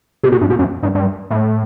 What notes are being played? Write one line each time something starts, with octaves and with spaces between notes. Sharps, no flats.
C3
B2
G2
B2
F#2
G2
G2
A2